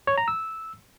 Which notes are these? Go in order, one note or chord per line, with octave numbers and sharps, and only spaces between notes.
C#5
A#5
E6